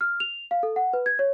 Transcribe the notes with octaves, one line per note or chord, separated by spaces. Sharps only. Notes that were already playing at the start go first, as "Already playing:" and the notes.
F6
F7
F5
A4
F#5
B4
G#6
C#5